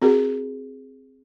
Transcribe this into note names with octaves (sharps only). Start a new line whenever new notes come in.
C4 F#4 G#4 A#4